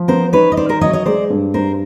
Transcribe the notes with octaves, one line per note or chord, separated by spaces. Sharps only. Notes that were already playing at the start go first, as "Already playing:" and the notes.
Already playing: F3
B3 A#4 C5
D#4 B4 C#5
D#5
D#3 C5 D5
A#4 C5
F#3 C#5 D#5
C#5 D#5
G#3 C5 D5
G2
G2 A#4 C5